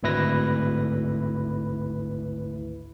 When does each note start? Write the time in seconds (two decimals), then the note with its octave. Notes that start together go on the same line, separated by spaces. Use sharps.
0.03 G#1 D2 E4 B4 A#6